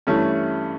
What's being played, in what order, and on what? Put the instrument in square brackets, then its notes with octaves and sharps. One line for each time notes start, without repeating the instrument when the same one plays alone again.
[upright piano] G2 E3 A3 C#4